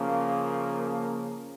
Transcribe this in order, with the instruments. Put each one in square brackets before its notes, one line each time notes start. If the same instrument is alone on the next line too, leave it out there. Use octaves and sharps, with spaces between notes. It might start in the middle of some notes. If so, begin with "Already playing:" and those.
Already playing: [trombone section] C#3 F3 A#3